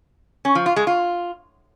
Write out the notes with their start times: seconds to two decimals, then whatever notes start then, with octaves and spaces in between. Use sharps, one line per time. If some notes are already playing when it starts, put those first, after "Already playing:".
0.45 C#4
0.55 F3
0.66 F4
0.76 G#3
0.87 F4